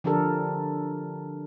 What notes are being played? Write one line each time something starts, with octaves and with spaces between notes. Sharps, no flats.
D3 F3 D4 G4 A4 A#4